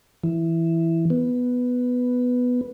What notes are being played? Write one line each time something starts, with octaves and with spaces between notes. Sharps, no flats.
E3
B3